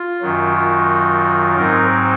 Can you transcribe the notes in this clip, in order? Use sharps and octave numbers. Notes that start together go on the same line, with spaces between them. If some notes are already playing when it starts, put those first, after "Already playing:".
Already playing: F4
F#2 D#3 F#3
F4
G#2 F#3 C4 D#4 A#4